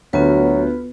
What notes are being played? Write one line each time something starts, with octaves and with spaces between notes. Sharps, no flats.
D2 F#3 B3 F4 B4